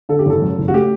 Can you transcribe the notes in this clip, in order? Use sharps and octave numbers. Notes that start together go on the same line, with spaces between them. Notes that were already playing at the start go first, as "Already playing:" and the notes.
D3 A4
G4
F#1 A4
F#2
F#1
F#4
A3 G4